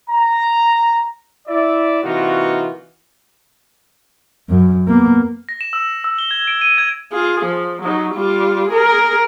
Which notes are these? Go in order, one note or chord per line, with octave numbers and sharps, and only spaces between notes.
A#5
E4 D5 E5
C3 E3 A#3 D#4 F4 F#4
F#2
A#3 B3
A#6
E7
E6
E6
G7
G#6
D7
D#7
G#6
F4 G#4
F3
F#3 D#4
G3 F4
G#4 A#4